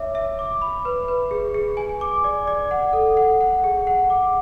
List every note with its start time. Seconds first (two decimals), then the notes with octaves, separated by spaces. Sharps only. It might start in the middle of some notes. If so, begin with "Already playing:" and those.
Already playing: C#5 E5 D6
0.15 E5
0.39 D6
0.61 B5
0.85 B4
1.08 B4
1.31 G#4
1.54 G#4
1.77 G#5
2.01 D6
2.24 D5
2.47 D5
2.71 F#5
2.93 A4
3.17 F#5
3.41 F#5
3.64 G#4
3.87 F#5
4.10 D6